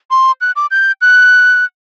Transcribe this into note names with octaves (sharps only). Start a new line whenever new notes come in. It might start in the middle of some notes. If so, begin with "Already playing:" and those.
C6
F#6
D6
G6
F#6